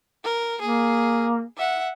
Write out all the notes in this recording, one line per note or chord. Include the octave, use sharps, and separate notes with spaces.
A#4
A#3 G#4
E5 F#5